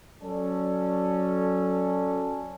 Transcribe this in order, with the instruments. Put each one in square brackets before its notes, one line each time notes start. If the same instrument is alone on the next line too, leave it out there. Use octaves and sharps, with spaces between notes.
[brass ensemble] F#3 C#4 A4 D5